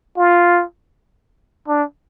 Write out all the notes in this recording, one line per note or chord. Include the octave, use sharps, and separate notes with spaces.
F4
D4